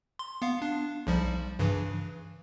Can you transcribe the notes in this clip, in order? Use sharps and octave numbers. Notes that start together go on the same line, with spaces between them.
C6
B3 F5
D4
B1 F3 G3
G2 C#3 E3